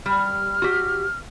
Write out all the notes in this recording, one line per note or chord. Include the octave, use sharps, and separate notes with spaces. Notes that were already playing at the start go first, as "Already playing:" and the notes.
G3 F6
F#4 G4